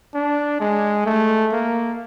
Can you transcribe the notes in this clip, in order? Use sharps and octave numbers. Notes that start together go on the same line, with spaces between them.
D4
G#3
A3
A#3